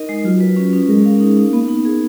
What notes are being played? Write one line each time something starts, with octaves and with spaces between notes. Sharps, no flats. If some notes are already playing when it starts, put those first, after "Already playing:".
Already playing: D#4 A#4 D#5
G#3
F#3 F4
B4
C#4
C#4
G#3 A#4
F5
D#4
D#4
A#3 B3
D#4
G#4